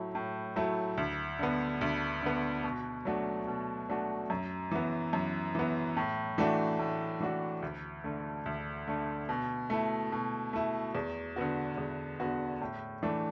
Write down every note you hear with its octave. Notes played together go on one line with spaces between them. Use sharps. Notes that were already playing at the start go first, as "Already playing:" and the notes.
Already playing: A2 F#3 A3 E4
A2
F#3 A3 E4
D2
D3 B3
D2
D3 B3
B2
F#3 A3 D4 F#4
B2
F#3 A3 D4 F#4
F#2
E3 B3
F#2
E3 B3
A2
E3 A3 D4 F#4
A2
E3 A3 D4 F#4
D2
D3 A3
D2
D3 A3
B2
A3 E4
B2
A3 E4
E2
D3 B3 F#4
E2
D3 B3 F#4
A2
E3 A3 D4